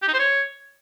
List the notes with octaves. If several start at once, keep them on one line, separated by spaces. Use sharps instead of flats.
G4
D#4
C5
C#5